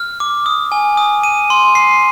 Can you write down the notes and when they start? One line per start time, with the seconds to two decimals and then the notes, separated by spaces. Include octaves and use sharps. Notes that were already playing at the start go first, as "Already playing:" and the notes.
Already playing: F6
0.20 D6
0.46 D#6
0.72 G#5
0.97 D#6
1.24 D#7
1.50 C6
1.75 C7